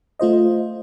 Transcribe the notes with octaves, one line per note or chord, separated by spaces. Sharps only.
A3 F4 C5 D#5